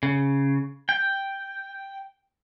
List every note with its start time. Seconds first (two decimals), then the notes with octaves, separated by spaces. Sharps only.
0.03 C#3
0.89 G5